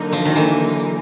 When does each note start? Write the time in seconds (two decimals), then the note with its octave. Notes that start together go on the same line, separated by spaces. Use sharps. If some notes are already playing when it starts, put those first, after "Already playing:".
Already playing: D3 F#3 A#3 D#4
0.12 F3
0.25 D#3
0.35 E3